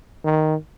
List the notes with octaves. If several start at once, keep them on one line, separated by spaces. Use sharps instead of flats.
D#3